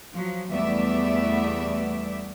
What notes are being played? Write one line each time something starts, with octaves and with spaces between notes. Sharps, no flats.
F3 F#3
E2 G3 A3 B3 D5 E5